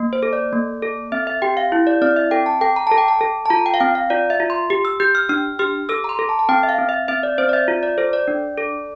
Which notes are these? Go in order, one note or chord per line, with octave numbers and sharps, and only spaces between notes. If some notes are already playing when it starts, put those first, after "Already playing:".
Already playing: A#3
C5
A4
D5
A#3
A4
C4 E5
E5
G4 G5
F5
E4
D5
C4 D5
E5
A4 G5
A5
A4 G5
A#5
A4 A5
G5
A5
A4
A5
F4 A#5
G5
F5
C4 G5
F5
F4 D5
E5
F4
C6
G4
E6
G4 G6
F6
D4 F6
G4 F6
A4 E6
A#5
C6
A4
A5
A5
C4 G5
E5
F5
C4
E5
C4 E5
D5
C4 C5
D5
E5
F4
D5
A4 C5
D5
D4
A4